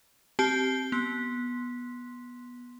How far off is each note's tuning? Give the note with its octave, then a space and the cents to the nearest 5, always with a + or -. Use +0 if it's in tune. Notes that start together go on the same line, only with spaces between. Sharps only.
C4 +0 G4 -20 A5 -35
B3 -15 C6 +0